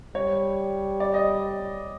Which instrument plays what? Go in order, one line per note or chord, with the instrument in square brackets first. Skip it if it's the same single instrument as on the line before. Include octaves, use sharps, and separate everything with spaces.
[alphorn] G3 [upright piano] C#5
[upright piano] D5
D#5